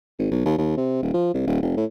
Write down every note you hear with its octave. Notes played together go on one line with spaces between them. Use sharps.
G#1
B1
D#2
D#2
C3
D#1
F3
C2
D#1
F1
A2